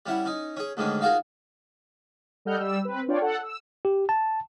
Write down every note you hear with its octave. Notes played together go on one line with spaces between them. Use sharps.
G3 C#4 E4 F#5
C#4 D#4
C#4 G#4
D2 G#2 D3 D#3 C#4
D#4 F4 F#4 G#4 A#4
G3 A4 D#5 F#5 F6 G6
G3 E6
C4 B4
D4 F4 C#5 D5 G5
A4 F#5
E6
G4
A5